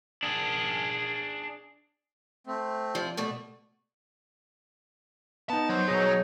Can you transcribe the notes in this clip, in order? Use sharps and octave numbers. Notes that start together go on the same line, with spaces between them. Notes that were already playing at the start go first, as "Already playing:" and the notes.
D4 G#4
A3 C4
F3 F4 D5
B2 A3 D5
B3 D#4 A5
F#3 C5
B2 D#4 G#4 C#5